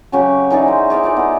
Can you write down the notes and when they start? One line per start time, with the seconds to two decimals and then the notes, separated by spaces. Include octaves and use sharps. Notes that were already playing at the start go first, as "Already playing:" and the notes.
0.12 C#3 F#3 C#4 G4
0.50 E3 D#4 G#4 D5
0.68 C5
0.90 G#4 D5 E5 F5
1.03 D#4 F4 D5
1.17 B3 E4